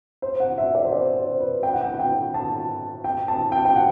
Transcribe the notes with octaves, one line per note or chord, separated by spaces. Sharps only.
C5
F#5
E5
D5
C5
D5
C5
B4
G5
F#5
G5
G5
A5
G5
A5
G5
G5
F#5